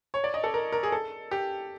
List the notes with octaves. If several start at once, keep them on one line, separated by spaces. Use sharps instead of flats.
C#5
D5
D#5
A4
A#4
A#4
G#4
A4
G4